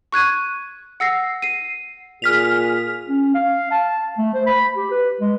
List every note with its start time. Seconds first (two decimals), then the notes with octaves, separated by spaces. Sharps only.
0.12 C#6 F#6 G#6 D#7
1.00 F#5 E6 A#6 C7
1.42 C7 D#7
2.22 A#2 G#4 F6 B6 F7
3.08 C#4
3.34 F5
3.72 A5
4.18 A3
4.34 C5
4.47 B5
4.75 G4
4.91 B4
5.21 G#3